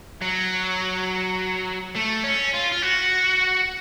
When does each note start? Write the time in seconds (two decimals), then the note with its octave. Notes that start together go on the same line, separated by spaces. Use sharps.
0.21 F#3
1.95 A3
2.24 C#4
2.54 F4
2.72 F4
2.82 F#4